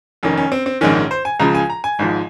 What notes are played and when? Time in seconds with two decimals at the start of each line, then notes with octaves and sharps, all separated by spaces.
0.23 F1 F2 D#3 C#4
0.37 C#4
0.52 C4
0.66 C4
0.81 A#1 G#2 D#3 C#4
0.95 C#4
1.11 C5
1.25 G#5
1.40 C#2 C#3 F3 A#5
1.55 G#5
1.70 A#5
1.84 G#5
1.99 G#1 G#2 F3